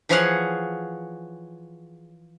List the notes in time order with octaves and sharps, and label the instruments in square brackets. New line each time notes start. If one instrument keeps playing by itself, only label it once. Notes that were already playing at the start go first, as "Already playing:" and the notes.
[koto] E3 F3 G#4 C#5 F5 F#5